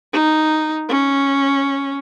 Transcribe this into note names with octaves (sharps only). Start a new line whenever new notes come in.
D#4
C#4